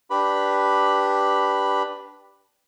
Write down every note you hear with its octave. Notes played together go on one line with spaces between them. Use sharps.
D4 G4 B4 B5